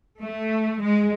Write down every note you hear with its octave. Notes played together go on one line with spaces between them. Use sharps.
A3
G#3